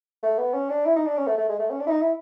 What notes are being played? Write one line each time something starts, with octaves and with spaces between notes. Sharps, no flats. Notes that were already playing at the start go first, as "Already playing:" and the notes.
A3
B3
C#4
D4
E4
D#4
D4
C#4
A3
A3
G#3
A3
C#4
D4
E4
D#4
E4